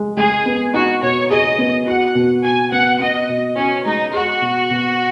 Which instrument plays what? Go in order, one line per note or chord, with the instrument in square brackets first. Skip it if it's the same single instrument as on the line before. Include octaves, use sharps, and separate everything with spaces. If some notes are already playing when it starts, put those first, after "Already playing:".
Already playing: [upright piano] G#3
[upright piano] G#3 [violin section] G#4
[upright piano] B3
[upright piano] D#4 [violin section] F#4
[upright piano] B2 [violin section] C#5
[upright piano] G#4 [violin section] D#5
[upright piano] B3
[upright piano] F#4 [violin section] F#5
[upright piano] B2
[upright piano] B2 [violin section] G#5
[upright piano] B3 [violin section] F#5
[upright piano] B3 [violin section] D#5
[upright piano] B2
[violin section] C#4 [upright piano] F#4
[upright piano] G#3 [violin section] D#4
[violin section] F#4 [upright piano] G#4
[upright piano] B2
B2